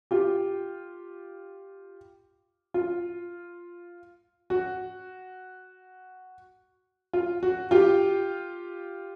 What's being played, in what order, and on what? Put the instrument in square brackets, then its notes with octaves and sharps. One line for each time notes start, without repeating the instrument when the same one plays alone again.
[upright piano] F4 G4
F4
F#4
F4
F#4
F4 G4